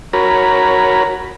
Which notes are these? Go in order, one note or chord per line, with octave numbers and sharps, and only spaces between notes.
F#4 A#4 C#5 A#5 B5